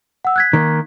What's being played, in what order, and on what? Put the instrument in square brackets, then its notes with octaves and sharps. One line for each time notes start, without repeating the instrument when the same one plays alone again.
[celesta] F#5 E6
F#6 G#6 B6
[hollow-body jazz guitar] D#3 A#3